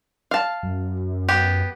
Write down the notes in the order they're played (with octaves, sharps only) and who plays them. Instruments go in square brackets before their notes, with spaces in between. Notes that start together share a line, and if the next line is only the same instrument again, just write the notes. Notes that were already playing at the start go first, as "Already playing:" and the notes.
[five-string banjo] F5 A5
[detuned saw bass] F#2
[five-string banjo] B3 G4